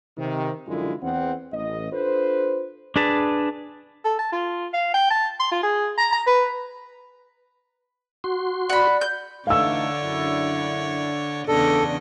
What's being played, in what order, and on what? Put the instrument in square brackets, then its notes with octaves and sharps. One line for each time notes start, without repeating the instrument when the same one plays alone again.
[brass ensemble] C3 D#3
F#2 D3 F3 G#3 E4 F4
E2 C4 F#5
A1 D#5
D4 F4 A4 B4 C5
[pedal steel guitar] D4 G#4 B4 A5
[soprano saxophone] A4
A5
F4
F5
G5
A5
C6
F4
G#4
A#5
A#5
B4
[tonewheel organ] F#4 C6
[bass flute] D5 [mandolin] F#5 B5
[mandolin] G6
[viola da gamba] D3 D4 C#5 [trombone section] E3 A3 D#4 [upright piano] F5 E6
[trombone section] F#2 E4
[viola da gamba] E2 C#3 D#5 [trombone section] D4 [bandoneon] A4